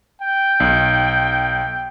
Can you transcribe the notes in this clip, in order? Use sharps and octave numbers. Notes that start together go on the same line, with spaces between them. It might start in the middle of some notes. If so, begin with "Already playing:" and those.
G5
B1 F#6